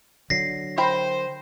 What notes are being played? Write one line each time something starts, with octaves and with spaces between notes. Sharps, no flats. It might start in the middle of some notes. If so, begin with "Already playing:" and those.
D3 F#3 A#6 C7
A#4 C5 G5 B5